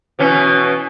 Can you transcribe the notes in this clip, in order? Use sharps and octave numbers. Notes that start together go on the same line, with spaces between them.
B2 E3 C#4